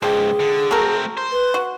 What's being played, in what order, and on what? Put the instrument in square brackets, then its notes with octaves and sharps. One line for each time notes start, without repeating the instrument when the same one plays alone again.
[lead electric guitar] C#2 G#2 [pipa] F3 G4 [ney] G#4
[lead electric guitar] D3
[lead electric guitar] A3 C4 [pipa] F#4 A4 A#4
[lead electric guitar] C5
[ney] B4
[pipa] F#4